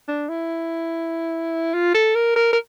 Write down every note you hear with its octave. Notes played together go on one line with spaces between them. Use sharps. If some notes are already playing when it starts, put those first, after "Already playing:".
D4
E4
F4
A4
A#4
A#4
A#4